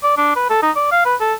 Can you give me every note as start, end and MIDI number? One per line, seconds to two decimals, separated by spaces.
0.03 0.15 74
0.17 0.34 62
0.36 0.46 71
0.50 0.58 69
0.62 0.71 63
0.76 0.89 74
0.91 1.04 77
1.05 1.16 71
1.20 1.34 69